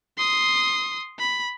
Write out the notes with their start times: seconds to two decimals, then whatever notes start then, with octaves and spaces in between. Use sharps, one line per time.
0.18 C6 D#6
1.20 B5